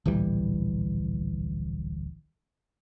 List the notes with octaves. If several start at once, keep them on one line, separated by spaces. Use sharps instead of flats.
D1 A#1 E3 G3